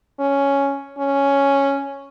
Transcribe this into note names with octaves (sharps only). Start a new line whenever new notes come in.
C#4
C#4